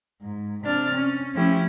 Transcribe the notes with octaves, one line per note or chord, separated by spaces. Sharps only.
G#2
C3 D4 F6 A6
C#4
F3 A3 C#4 E4 G4